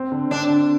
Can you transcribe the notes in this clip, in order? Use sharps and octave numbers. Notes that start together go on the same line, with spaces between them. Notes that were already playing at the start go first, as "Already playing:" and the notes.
Already playing: C4
D3
C4 D4
D3